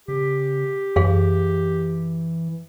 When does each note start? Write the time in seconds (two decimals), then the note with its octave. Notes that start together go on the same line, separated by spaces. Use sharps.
0.08 C#3 G4
0.96 F#2 E3 G#4 F5